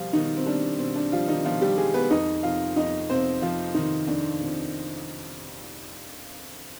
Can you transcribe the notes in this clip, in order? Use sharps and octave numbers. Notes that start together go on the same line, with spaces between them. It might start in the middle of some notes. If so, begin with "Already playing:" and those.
Already playing: B2 F3 G3 F4
B2 D#3 D#4
C4
G3 D4
B2 C4
D4
F3 G3 F4
D#3 D#4
B2 F3 F4
G3 G4
G3 G#3 G#4
B3 B4
F2 D#4 D#5
C3 F3 F4 F5
F2 D#4 D#5
C3 F3 C4 C5
F2 F3 F4
C3 D#3 F3 D#4
F2 D4
C3 F3